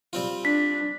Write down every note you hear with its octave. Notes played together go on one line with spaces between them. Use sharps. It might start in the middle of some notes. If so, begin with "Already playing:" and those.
G3 C4 F4
D4 B6